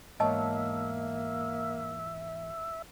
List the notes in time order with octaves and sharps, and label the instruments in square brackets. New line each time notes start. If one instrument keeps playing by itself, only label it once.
[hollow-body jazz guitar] E2 G#2 C#5 [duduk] A#3 [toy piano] D#5 A5 [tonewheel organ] E5